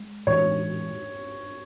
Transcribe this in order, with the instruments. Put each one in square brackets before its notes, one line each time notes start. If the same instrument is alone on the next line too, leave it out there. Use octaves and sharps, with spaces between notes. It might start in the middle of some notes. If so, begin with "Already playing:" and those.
Already playing: [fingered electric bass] G#3
[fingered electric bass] A2 E3 G#3 [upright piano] C#5